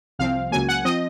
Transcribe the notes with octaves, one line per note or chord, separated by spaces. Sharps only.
C2 C3 F3 C4 F5
C#2 C#3 F#3 A#3 G#5
F#5
F3 C4 D#5